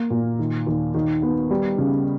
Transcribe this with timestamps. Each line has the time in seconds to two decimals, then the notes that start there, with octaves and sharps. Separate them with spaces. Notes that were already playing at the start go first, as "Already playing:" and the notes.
Already playing: A#3
0.10 A#2
0.39 D#3
0.67 D#2
0.94 D#3
1.22 B3
1.51 G3
1.78 C#3